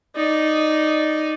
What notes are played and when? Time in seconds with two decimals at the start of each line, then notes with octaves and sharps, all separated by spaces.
0.16 D#4 D5